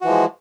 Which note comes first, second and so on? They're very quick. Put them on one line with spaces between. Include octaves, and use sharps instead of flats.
F#4 E3 F3 G#3